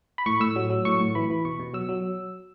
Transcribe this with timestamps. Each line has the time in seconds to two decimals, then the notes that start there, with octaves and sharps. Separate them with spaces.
0.18 B5
0.26 A2 C#6
0.40 A2 E6
0.56 F#3
0.70 F#3
0.85 A2 C#6
1.00 A2
1.15 E3 B5
1.30 E3
1.45 B2 C#6
1.60 B2
1.74 F#3 E6
1.89 F#3